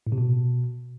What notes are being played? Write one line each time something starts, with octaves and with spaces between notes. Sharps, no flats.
A2
C3
B2